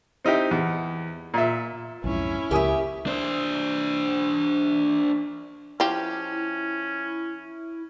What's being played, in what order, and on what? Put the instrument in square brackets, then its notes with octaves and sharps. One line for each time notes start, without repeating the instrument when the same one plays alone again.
[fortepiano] C4 D#4 E4 G4
E2
A#2 E5
[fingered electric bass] B1 F2 G#2 [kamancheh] C#4 E4
[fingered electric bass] C#2 [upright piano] A#3 G#5 D#6 [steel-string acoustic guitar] G4 E5
[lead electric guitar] D4 C5
[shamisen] F3 G4 [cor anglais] C#4 [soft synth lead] E4